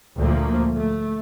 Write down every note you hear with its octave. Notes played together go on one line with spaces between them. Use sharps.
D2 A#2 D3 F3 A3 A#3
A3